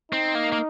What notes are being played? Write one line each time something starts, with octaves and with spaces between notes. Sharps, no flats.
C4 D#4
A#3
A#3